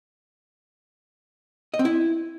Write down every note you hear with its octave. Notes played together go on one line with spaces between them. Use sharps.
D#5
C4
E4